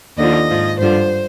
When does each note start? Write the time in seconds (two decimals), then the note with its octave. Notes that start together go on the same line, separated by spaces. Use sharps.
0.18 D#2 D3 F3 D#5
0.50 G#2 F3
0.80 G2 D3 F3 C5